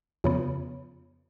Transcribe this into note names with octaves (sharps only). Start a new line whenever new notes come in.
F2 C#3 B3